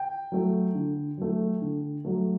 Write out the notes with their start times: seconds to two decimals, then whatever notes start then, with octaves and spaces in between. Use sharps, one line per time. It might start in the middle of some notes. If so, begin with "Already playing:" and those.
Already playing: G5
0.32 F#3 A3
0.75 D3
1.18 F#3 A3
1.61 D3
2.05 F#3 A3